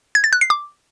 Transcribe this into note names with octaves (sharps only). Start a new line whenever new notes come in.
G#6
A6
F#6
C7
D6